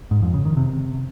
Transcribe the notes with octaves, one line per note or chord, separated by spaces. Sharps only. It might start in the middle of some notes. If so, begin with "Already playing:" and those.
G#2
F2
C#3
D#3
C3